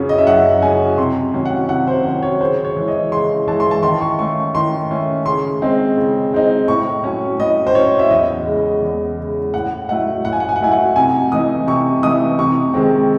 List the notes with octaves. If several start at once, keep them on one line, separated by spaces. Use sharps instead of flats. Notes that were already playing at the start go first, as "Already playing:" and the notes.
Already playing: F#2 C#3 F#3 C#4
D#5
E5
F#2 F#5
C#3 F#3 C#4 G#5
C3 C6
D#3 F#3 C#4
F#5
C3 F#5
C5
D#3 F#3 C#4
C#5
C#3 C5
C#5
E3 G#3
D#5
C#3 C6
E3 G#3 A5
C6
A5
D#3 C6
C#6
A3 C#4 C#6
D#3 C6
A3 C#4
C#3 C6
G#3 C4 D#4
C#3
G#3 C4 D#4
A2 C#6
F#3 C#4
A2 D#5
C5
F#3 C#4 C#5
E5
E2 D#5
C#3 G#3
E2
C#3 G#3
A2 F#5
F#3 A3 D#4 F#5
A2 F#5
G#5
F#5
G#5
F#5
F#3 A3 D#4 G#5
F#5
C3 G#5
E3 A3 D#4 D#6
C3 C#6
E3 A3 D#4 D#6
C3 C#6
D#3 G#3 C4